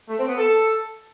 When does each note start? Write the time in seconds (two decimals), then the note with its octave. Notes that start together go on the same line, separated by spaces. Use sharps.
0.09 A3
0.19 C4
0.28 B3
0.38 A4